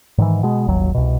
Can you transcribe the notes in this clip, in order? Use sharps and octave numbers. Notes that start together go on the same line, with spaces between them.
G#2 D#3 E3
B2 G#3
D#1 G#1 D#2 F#3
C2 B2